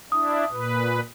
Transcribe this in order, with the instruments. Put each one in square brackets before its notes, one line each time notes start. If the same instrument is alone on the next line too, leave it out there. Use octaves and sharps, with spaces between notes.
[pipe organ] D4 E4 [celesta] D#6
[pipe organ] A#2 B4